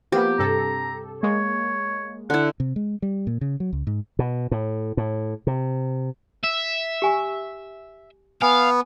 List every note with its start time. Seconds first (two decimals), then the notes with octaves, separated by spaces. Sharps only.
0.12 F3 A#3 B3 G4
0.39 G2 C3 A4 A#5
1.23 G#3 A#3 C#5
2.30 D3 E4 F#5
2.60 C3
2.76 G#3
3.02 G3
3.27 A#2
3.41 C#3
3.60 F#3
3.73 C#2
3.87 G#2
4.19 B2
4.51 A2
4.97 A2
5.47 C3
6.44 E5
7.02 G4 G#5 C#6
8.42 B3 F5 G#5